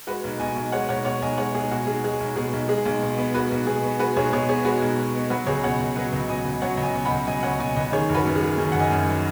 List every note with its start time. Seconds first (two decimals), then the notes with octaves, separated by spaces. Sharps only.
0.07 G#3 F#4 B4
0.24 B1
0.40 B2 D#5 G#5
0.56 B1
0.72 G#3 C#5 F#5
0.89 B1 C#5 F#5
1.05 B2 C#5 F#5
1.22 B1 D#5 G#5
1.38 G#3 C#5 F#5
1.55 B1 G#4
1.71 B2 F#4
1.87 B1 G#4
2.04 G#3 G#4
2.20 B1
2.36 B2 G#4
2.53 B1
2.69 G#3 G#4
2.86 B1
3.02 B2
3.18 B3
3.34 G#3 F#4 B4
3.52 B1
3.67 B2 G#4
3.84 B3
3.99 G#3 F#4 B4
4.16 B1 G#4 C#5
4.33 B2 G#4 C#5
4.49 B3 G#4 C#5
4.65 G#3 F#4 B4
4.82 B1
4.98 B2
5.15 B3
5.30 F#3 F#4 B4
5.47 C#2 G#4 C#5
5.63 B2 C#5 F#5
5.80 C#2
5.96 F#3 B4 D#5
6.13 C#2
6.28 B2 D#5 G#5
6.45 C#2
6.62 F#3 C#5 F#5
6.77 C#2
6.83 D#5 G#5
6.94 B2
7.05 F#5 B5
7.11 C#2
7.27 F#3 D#5 G#5
7.43 C#2 C#5 F#5
7.59 B2 D#5 G#5
7.76 C#2 D#5 G#5
7.92 D#3 G#4 C#5
8.09 F#1
8.14 F#4 B4
8.26 F#2
8.36 G#4
8.42 F#3
8.57 D#3 G#4
8.72 F#1 F#5
8.80 D#5 G#5
8.91 F#2
9.06 F#3